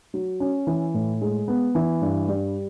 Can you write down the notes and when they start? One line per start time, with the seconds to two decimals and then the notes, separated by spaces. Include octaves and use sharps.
0.14 F#3
0.40 C#4
0.67 E3
0.94 A2
1.21 G#3
1.48 B3
1.75 E3
2.02 G2
2.28 G3